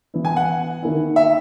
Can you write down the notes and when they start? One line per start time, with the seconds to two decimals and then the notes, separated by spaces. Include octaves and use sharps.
0.14 E3 B3 E4
0.25 G#5
0.36 F#5
0.82 D#3 A#3 E4
1.16 E5